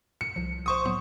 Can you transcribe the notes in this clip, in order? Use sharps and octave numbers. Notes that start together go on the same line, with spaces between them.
C#7
C2 F3
C5 C#6 D#6
A2 F#3 B3